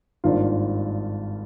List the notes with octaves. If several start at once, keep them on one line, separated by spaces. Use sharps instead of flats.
G#1 G2 D#3 A#3 F4